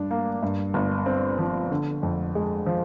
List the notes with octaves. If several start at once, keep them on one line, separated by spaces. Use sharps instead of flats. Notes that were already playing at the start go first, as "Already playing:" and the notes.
Already playing: G2 D4
A#3
G2
G1
C4
F3
D3
F2
G#3
F3